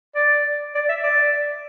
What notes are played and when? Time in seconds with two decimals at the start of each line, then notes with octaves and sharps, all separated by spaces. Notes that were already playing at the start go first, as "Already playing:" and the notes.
0.15 D5
0.75 D5
0.89 E5
1.04 D5